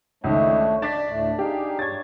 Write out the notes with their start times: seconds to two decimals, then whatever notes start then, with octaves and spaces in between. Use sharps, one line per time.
0.24 C#2 D#3 A3 D4 C#5
0.82 D4 A6 B6
1.08 D2 A2 A3
1.39 D#4 G4 G#4 F5
1.79 G2 C#5 G#6 A6